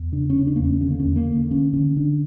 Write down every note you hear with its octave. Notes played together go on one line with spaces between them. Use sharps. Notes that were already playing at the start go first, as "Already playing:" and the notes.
Already playing: E2
C#3 D4
C#4
C#3
D4
A#3
E2
C#4
D3 C#4
A#3
E2 C#4
A#3
D3
D3 C#4
D3 C#4
D3 D4